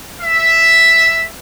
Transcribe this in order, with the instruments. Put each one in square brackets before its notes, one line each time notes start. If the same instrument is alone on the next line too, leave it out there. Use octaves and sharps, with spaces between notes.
[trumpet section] E5